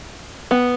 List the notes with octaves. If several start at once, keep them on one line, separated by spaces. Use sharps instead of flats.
B3